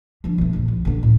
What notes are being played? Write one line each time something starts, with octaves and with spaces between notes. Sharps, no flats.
F3 D4
B1 A3
A#1 F#2
F3
D3 D4
C#2 A2